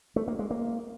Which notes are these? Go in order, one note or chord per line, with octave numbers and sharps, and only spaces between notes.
A3
A#3
G#3
A#3